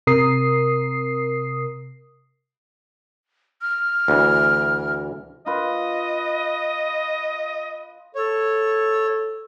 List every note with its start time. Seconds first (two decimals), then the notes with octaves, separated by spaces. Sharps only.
0.07 C3 A#4 D#6 C7
3.62 F6
4.08 D2 E3
5.46 F4 B4 D#5
8.15 A4 C#5